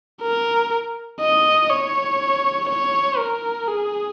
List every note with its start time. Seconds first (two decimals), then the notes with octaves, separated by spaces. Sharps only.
0.22 A#4
1.21 D#5
1.70 C#5
2.69 C#5
3.18 A#4
3.68 G#4